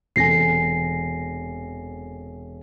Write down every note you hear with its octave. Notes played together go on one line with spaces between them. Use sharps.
E1 C3 A4 G#5 A#6 C7